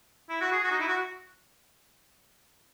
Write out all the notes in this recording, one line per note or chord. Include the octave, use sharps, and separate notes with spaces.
E4
F#4
G#4
F#4
D#4
E4
F#4